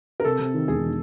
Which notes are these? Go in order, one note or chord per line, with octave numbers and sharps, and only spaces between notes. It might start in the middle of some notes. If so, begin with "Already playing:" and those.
A#4
C3 A4
C3
D#3
E1 G#4
D#3